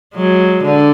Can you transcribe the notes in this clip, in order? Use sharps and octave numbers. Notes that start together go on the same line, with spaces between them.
F#3 G#3
D3